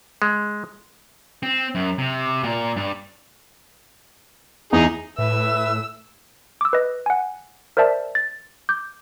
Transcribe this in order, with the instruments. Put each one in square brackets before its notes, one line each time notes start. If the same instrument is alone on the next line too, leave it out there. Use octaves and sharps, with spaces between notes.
[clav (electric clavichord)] G#3
[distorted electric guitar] C4
F#2
C3
A#2
G2
[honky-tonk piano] E2 E4 [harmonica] D#4 G#4
[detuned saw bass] A2 [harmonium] B4 E5 [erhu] E6
[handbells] D6 E6
B4 D#5
F#5 G#5
A#4 C5 D5 E5 A5
A6
D6 G6